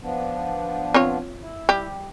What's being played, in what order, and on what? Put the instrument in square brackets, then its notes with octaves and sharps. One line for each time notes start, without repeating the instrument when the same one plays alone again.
[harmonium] F3 B3 D4
[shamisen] C4 F4 C#5
[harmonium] E4
[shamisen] G3 G4